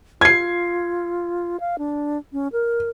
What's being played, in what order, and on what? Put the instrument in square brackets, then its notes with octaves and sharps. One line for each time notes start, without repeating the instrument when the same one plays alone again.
[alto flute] F4 [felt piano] G#6 C7
[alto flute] F5
D4
C#4
A#4